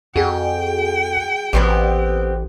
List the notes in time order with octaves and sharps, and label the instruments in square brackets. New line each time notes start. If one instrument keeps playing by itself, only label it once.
[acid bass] F2 [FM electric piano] F#4 G#4 [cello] G5
[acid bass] A1 [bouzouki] B3 C4 G4